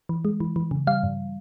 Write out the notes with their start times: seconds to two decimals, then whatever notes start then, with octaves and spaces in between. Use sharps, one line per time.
0.09 E3
0.25 G#3
0.40 E3
0.56 E3
0.71 C#3
0.87 G3 F5
1.03 G2